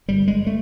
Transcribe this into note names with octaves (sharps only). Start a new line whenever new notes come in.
G1 G3
G#3
A3